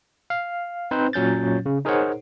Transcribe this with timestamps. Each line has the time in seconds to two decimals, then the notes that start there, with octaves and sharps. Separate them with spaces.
0.30 F5
0.91 C4 D#4 B4 C5
1.13 A#2 F#3 C#4 G6 A6
1.66 C#3
1.85 D#4 G#4 A#4 C5 C#5 F#5